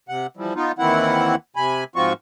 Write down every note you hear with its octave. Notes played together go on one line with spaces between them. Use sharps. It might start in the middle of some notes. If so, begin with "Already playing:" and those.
C3 F#5
E3 F3 G3
B3 D#4 F4
D#2 D#3 E3 C4 E4 F#5
C3 G#5 B5
G#2 F3 C4 F4 F#4 C#6